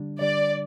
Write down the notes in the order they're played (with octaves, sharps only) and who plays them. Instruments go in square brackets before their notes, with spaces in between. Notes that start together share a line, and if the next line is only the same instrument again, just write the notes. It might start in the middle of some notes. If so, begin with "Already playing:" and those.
Already playing: [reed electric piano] D3 G3 D4
[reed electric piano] D3 G3 D4 [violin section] D5